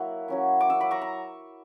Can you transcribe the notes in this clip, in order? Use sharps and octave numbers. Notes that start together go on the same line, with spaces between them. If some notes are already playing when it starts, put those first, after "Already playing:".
Already playing: F#3 A#3 E4 F#5
F#3 C#4 E4
D6
C#6 E6
B5 D6
A#5 C#6
A#5